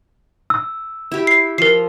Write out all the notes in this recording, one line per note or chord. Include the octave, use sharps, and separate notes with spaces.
E6
E4 G4
C7
F3 A#4 C7